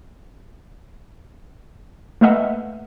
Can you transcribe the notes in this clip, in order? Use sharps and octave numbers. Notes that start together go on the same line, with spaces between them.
A3 A#3 B4 D#5 E5 F#5